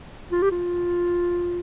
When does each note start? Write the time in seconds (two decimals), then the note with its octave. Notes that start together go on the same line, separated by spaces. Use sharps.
0.32 F4
0.42 G4
0.51 F4